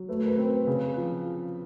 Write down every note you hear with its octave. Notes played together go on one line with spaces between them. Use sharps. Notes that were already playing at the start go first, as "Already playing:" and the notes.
Already playing: F#3
A3 B4
A#4
B4
C4
B4
C#3
F3